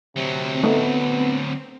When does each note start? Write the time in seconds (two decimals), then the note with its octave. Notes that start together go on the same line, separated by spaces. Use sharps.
0.16 D2 C3 F#3 C4
0.63 A3 B3 D#4